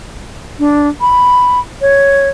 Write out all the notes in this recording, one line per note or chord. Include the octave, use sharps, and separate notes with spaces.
D4
B5
C#5